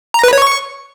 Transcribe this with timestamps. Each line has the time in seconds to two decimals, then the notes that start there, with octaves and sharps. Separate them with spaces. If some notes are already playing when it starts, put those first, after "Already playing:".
0.14 A#5
0.24 B4
0.33 C#5
0.42 C#6